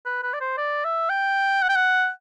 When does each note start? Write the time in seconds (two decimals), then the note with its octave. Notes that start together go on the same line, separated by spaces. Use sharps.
0.06 B4
0.23 B4
0.33 D5
0.41 C5
0.58 D5
0.84 E5
1.10 G5
1.62 F#5
1.69 G5
1.76 F#5